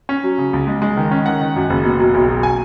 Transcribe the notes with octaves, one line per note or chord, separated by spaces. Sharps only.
C#4
F#3
C#3
C#2
G#3
G#3
D#3
C#4
D#3 F#5
D#3
F#2
F#1
B2
F#3
B1
F#3
G#5